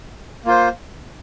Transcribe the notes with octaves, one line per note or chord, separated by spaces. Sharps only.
A#3 F4 C5